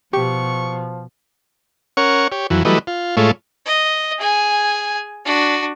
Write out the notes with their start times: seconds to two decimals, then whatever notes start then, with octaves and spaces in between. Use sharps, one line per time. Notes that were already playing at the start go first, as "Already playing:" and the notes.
0.13 B2 F3 G4 C#6
1.97 C#4 A#4 C#5 F#5 C#6
2.32 G4 C#5
2.50 F2 E3 F#3
2.65 E3 F#3 G3 A3 B4 D#5
2.87 F4
3.17 A2 G#3 A3 F4 C#5
3.66 D#5
4.18 G#4 G#5
5.25 D4 F#4